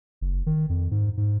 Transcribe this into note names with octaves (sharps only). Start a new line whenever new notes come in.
F#1
D#3
F2
G#2
G#2